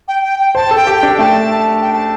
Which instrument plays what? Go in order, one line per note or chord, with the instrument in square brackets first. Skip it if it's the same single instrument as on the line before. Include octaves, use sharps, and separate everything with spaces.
[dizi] G5
G5
G5
[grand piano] C5 [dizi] A5
[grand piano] A4
[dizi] G5
[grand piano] G4
[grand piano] D4 [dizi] G5
[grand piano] A3 [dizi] A5
[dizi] G5
A5